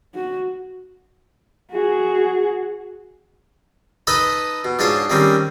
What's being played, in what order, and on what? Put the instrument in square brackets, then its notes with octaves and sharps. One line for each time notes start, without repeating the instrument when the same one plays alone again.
[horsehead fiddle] F#4
F#4 G#4
[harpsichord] D#4 A4 B4 D#5 A5 B5
B2
G#2 D4 F4 C#5 A5
D#3 G3 A#3 C4 C#4